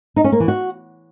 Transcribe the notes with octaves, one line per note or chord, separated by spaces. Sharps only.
D#4
C#4
A#3
E3
F#4